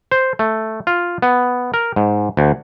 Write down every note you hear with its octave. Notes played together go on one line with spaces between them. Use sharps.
C5
A3
F4
B3
A#4
G#2
D2